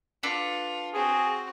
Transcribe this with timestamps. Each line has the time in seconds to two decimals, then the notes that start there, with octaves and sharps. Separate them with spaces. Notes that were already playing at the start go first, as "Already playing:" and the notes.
0.23 D4 F4 A4 B4
0.94 C4 F#4 G#4